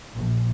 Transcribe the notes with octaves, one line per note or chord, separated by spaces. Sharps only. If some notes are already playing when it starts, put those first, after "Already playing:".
A#1